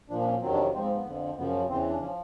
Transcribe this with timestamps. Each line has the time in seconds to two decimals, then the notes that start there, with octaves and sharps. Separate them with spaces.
0.10 A#2 F3 D4
0.21 D4
0.26 C#4
0.41 F2 C3 D#3 F#3 C4
0.53 D4
0.58 C#4
0.73 G#2 F3 C4
0.84 C4
0.95 B3
1.05 F2 D3 F3
1.37 F#2 C#3 F3 B3
1.69 E2 C#3 E3 C4
1.88 D4
2.01 F3 C#4